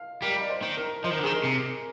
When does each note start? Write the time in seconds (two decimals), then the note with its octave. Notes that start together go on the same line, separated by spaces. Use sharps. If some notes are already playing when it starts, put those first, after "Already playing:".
Already playing: F5
0.22 G3 A#4
0.41 D5
0.50 C5
0.63 D#3
0.77 A#4
1.04 F3 C5
1.10 D#3 A#4
1.19 D3
1.23 D#3 G#4
1.32 A#4
1.44 C3